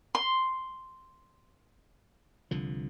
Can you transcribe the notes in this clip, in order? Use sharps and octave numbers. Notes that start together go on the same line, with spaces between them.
C6
C2 D3 F3